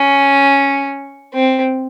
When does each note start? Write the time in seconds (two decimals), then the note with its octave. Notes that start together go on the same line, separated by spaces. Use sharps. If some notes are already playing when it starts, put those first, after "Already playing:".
Already playing: C#4
1.33 C4